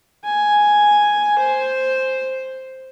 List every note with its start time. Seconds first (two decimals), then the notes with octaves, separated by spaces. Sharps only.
0.24 G#5
1.39 C5